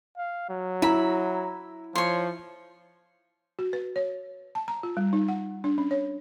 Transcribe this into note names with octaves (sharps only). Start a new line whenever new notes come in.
F5
F#3
E4 E5 A#5 B5
F3 C#5 C6
F#4
B4
C#5
A5
A#5
F4
G3
D#4
F#5
D4
C#4
C#5